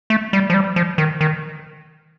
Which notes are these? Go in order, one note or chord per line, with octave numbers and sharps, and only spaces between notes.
A3
G3
F3
G3
F3
D#3
D#3